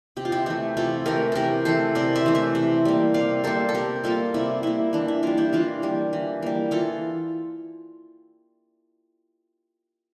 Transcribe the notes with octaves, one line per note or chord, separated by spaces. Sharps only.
C3 G4
F4
E4 G4
E3 A3 E4 G4
C3 F4 A4
E3 A3 G4 A#4
C3 G4 A4 A#4
E3 A3 A4 C5
C3 A#4 D5
C5 E5
E3 A3
C5 E5
C3
G3 A#3
C3 D5 F5
G3 A#3 A4 C5
A4
C3 G4 A#4
G3 A#3 F4 A4
C3 E4
G3 A#3 E4
E3 D4
E4
G3 A#3 D4 F4
E4 G4
E3 D4 F4
G3 A#3
E3
G3 A#3
E3 F4 A4